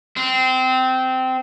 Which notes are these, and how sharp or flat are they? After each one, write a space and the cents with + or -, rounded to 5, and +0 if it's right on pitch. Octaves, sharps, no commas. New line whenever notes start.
C4 -20